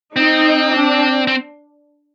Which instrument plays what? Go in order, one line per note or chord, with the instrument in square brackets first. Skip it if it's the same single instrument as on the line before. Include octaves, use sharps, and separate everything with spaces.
[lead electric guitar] C4 [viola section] D#4
[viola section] D4
[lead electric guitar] C4